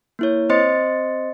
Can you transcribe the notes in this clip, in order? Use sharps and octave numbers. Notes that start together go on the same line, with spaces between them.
A#3 E4 C#5
C4 C5 D#5 C6 A6 C#7